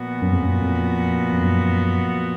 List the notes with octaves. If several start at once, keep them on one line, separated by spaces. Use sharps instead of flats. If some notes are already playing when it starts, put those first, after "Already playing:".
Already playing: A#2 F3 B3 F#4
F#2
F2
F#2
F2
F2
F#2